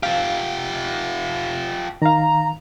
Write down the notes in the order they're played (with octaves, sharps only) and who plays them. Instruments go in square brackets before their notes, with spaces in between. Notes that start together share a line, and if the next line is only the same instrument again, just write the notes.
[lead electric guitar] F4 G4 [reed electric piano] F5
[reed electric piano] D#3 F5 [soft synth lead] A#5